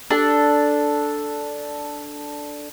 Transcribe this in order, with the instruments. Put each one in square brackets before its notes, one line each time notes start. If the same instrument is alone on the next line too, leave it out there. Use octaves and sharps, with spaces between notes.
[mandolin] D4 A4